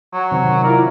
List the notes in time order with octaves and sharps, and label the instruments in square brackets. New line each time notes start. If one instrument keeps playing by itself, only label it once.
[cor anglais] F#3
[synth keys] C3 D#3 C4
[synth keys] E4 F4 D5 [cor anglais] A#4